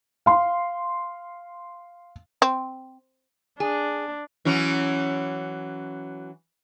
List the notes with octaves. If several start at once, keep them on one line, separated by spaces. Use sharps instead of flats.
F5 C6
C4
D4 G#4
E3 F#3 C#4